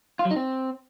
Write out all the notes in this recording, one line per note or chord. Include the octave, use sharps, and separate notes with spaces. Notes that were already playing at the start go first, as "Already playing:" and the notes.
F4
F#3
D#4
C4